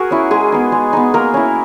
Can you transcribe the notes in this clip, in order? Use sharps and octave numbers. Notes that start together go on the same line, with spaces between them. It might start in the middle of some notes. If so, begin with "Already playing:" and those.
Already playing: F#4 G#4 A#4
C#4 E4
G#3 G#4
B3 D#4
G#3
B3 D#4
A#3 A#4
C#4 E4